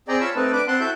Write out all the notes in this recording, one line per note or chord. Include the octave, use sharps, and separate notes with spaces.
C4 G#4 D5 D#5 G5 A#5
F4 C#5 A5 B5 E6
A3 C4 D#4 B4 A5
D4 B4 D6 F#6
C4 F#5 A5 C6 F#6
E4 F#4 A4 E5 F#6 G6